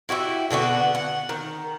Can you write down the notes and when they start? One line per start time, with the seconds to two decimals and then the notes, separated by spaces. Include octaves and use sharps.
0.09 E4 F#4 G4 E5
0.51 B2 D3 B3 F#4
0.95 F#5
1.29 D#3